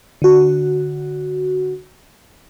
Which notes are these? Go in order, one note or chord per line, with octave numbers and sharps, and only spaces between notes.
D3 F#4